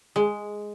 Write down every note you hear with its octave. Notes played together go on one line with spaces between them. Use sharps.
G#3